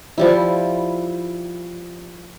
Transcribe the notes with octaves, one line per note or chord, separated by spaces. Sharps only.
F3 G3 E4